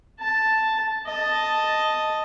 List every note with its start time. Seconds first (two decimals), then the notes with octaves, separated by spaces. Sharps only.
0.20 A5
1.07 D#5 A5